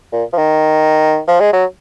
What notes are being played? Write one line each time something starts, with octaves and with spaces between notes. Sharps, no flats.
A#2
F3
D#3
F3
G#3
F#3